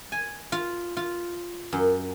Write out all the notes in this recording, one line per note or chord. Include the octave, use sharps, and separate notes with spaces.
G#5
F4
F4
F#2